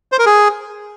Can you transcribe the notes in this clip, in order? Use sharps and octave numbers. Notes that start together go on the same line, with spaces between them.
C5
A#4
G#4